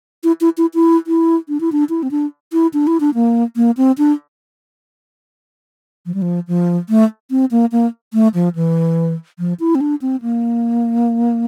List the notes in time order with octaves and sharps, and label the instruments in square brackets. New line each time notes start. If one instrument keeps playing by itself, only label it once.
[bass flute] E4
E4
E4
E4
E4
D4
E4
D4
E4
C4
D4
E4
D4
E4
D4
A#3
A#3
C4
D4
F3
G3
F3
F3
A3
C4
A#3
A#3
A3
F3
E3
F3
E4
C4
D4
C4
A#3